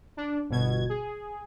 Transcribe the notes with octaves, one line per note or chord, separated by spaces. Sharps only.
D4
G1 B2 G#6
G#4